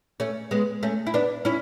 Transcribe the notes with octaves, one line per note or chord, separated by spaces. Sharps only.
A3 C#4
G#3 B3
A3 C#4
E4
B3 D4
C#4 E4